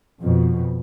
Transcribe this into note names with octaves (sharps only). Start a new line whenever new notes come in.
F2 B2